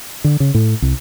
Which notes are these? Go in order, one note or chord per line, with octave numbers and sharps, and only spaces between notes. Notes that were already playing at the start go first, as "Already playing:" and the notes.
D3
C#3
A2
C2